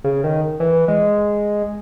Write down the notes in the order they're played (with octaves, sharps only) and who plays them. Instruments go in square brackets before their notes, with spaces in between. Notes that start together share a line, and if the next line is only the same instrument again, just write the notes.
[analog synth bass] C#3
D#3
E3
G#3